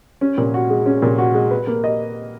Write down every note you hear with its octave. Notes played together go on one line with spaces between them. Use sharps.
C#4
A#2
F#4
G#3
C#4
A#2
F#4
G#3
B4
A#3
D#5